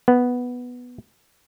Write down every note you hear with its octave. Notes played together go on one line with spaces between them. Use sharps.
B3